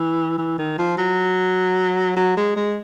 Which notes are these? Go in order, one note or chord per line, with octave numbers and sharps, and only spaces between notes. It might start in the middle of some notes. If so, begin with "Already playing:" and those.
Already playing: E3
E3
D#3
F3
F#3
F#3
G#3
G#3